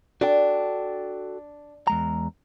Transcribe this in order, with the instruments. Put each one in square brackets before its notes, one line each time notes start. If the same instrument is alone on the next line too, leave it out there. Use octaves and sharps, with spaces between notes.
[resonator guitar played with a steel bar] D4 [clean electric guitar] F#4 A4 G5
[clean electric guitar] E2 G#3 A#5